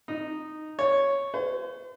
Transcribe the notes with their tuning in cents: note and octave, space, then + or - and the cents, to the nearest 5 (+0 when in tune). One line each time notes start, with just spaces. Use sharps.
D#4 -10
C#5 +0
C5 -45